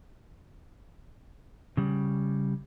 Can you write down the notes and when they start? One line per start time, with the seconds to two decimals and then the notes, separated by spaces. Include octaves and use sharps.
1.77 C#3 G3